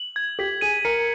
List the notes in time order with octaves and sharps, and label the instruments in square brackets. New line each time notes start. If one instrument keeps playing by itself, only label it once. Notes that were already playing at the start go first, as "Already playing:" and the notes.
Already playing: [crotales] F#7
G#6
[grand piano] G4 [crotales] B6
[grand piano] G#4 [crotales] D#7
[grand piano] A#4 [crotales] C#7